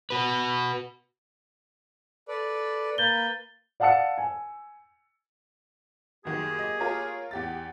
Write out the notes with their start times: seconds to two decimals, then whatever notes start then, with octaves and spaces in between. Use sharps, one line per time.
0.10 F#4 B4
2.28 A4 B4 D5
2.98 A#3 B4 G6 A6 G7
3.80 D5 F5 F#5 A5 E6 C#7
4.18 G#5
6.25 F#2 D#3 A#3 G4 G#4
6.59 D#5
6.80 F4 A#4 C#5
7.31 E2 G4 A6